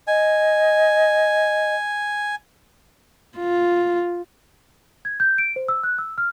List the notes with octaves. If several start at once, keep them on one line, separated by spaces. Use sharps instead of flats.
D#5 G#5
F4
G#6
G6
D7
C5
E6
F#6
E6
F6